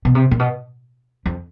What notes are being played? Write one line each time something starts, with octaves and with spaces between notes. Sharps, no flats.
B2
C3
A#2
B2
F2